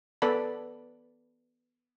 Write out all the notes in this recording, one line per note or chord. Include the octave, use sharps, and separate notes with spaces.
B3 A4 B4 D5 B5